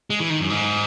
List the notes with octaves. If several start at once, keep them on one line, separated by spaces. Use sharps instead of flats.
G#3
E3
D#3
F#2
G#2